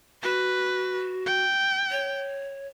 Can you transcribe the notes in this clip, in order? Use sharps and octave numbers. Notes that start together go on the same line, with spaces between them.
F#4 B4
G5
C#5